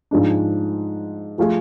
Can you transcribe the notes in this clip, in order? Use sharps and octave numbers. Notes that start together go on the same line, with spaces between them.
G#2 F3 G#3 D4
F3 A3 F4 G#4